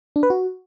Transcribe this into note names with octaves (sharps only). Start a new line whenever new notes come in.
D4
B4
F#4